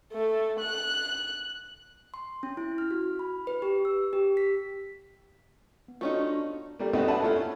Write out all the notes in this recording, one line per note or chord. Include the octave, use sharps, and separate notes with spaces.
A3
F#6
C6
C#4
E4
F6
F#4
B5
B4
G4
E6
G4
B6
B3
A3 C#4 D#4 F4 F#4 D5
D4
G3 A3 A#3
G3 A3 B3 C4 D#4 F#4
C#4 D4 B4 E5 F#5 A5
A3 C#4 E4 F4 A4
C#4